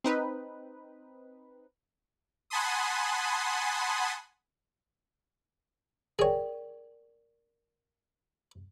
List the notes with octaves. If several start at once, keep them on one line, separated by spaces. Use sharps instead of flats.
C4 D#4 B4
F#5 G#5 A5 B5 C6 D#6
G#4 A#4 C#5 D5 G5